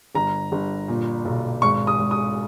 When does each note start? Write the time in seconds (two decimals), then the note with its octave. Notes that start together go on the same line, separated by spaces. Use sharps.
0.15 G1 A#5
0.52 G1
0.88 A#2
1.25 B1
1.62 G#1 C#6
1.87 D#6
1.99 G#1
2.11 D#6